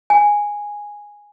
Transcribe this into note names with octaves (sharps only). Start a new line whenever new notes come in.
G#5